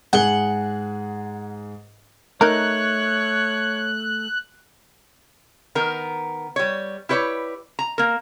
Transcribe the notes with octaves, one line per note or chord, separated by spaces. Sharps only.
G#2 G#4 F#5 G7
A3 D#4 A#4 C#5 F#6
D#3 B3 A#4
G3 C#5
E4 G4 B4 C#5 D5
A#5
A#3 A#4